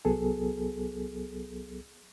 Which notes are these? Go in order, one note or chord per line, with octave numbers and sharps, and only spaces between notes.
C2 F#3 B3 G#4 A4